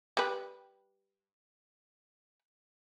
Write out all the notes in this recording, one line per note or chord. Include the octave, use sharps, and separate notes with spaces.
G3 B4